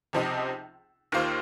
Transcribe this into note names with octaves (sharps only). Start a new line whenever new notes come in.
C#2 C3 F3 C4 D#4
D#2 D#3 A#3 F4 C5